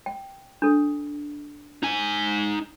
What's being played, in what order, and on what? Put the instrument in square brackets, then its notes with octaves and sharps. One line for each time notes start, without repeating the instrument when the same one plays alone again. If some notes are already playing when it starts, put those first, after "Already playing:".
[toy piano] G5
D4 A4
[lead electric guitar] D#4 G#5